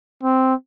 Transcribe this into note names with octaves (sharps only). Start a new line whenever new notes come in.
C4